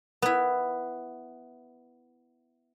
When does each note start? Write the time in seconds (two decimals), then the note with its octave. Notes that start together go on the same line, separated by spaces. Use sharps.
0.22 B3 E4